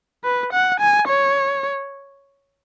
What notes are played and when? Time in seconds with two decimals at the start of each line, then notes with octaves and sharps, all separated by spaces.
0.24 B4
0.53 F#5
0.80 G#5
1.08 C#5